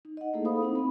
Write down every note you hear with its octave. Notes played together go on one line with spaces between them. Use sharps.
D#4
D#5 F#5
A3 A#3 D#4 E4 G#4 A4
A4 C5 F5 B5 D#6
C4 D#4 E4
C4 E4 B5